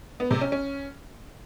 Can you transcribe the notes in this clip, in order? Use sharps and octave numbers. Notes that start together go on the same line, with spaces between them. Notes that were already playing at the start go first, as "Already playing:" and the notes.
B3
C3
C#4
C#4